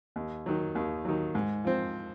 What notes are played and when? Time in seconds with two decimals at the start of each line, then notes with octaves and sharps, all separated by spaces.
0.16 D#2
0.46 D#3 F#3
0.75 D#2
1.05 D#3 F#3
1.35 G#2
1.65 F3 C4